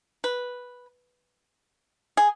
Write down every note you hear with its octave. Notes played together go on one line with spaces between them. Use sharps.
B4
G#4